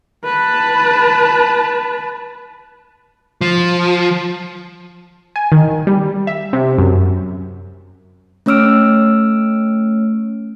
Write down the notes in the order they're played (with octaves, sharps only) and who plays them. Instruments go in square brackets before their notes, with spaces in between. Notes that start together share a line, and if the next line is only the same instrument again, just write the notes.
[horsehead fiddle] B4 A5
[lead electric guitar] F3
[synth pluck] G#5
D#3
G3
E5
C3
F#2
[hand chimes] A3 C#4 C#5 E6 F6 D7